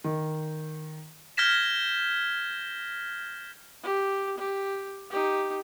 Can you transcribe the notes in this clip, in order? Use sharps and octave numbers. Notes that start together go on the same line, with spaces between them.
D#3
F6 G6 G#6 A#6 B6 E7
G4
G4
D#4 G4